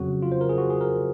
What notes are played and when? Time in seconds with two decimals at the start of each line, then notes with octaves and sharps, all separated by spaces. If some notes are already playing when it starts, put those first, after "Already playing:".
Already playing: F2 C#3 F#3 F#4
0.22 F4
0.32 C5
0.41 A#4
0.49 G#4
0.58 F#4
0.70 G#4
0.81 A#4